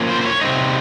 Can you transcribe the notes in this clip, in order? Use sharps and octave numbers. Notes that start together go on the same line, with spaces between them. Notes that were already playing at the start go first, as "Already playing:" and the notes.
Already playing: F3 A#3 C#4
C5
C5
C#5
C3 G3 C4 D#4